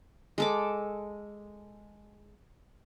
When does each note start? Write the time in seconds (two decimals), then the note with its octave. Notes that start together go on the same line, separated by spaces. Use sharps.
0.38 G#3 A4 D6